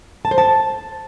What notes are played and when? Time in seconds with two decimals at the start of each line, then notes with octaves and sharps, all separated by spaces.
0.25 A5
0.31 C5
0.38 A5